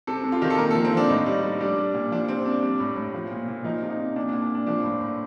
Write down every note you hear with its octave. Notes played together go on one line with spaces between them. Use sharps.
C3 A4
C3
F4
D#3 G4
A4
A#2 A#4
A4
F3
C4
F3 D4
A2 D#4
G3
G3
G3 D4
G3
A#2
F3 D4
C3 C4
C3 D4
G3
A2
A2
F3
A#2
A#2
F3 D#4
C3
D#4
C3
A#2 D4
D4
A#2
D4
A#2
D4
F3 D4
A2
A2